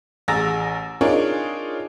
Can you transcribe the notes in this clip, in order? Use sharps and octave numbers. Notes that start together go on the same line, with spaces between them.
A1 G#4 A#5 E6 A6 A#6
D4 D#4 F4 G#4 A#4 C#5